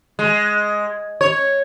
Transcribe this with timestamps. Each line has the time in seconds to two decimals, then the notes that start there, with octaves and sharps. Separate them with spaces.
0.19 G#3
1.21 C#5